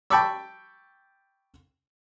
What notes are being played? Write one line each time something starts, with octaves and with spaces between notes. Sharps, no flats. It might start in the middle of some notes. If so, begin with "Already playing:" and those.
G5 A5 B5 C#6 D6 E6